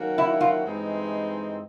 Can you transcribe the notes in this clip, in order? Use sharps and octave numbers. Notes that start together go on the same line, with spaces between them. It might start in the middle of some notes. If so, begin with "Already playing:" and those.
Already playing: D#3 F#3 A#3 C#4 F#4
E4
F4
G2 E3 G#3 C4 D#4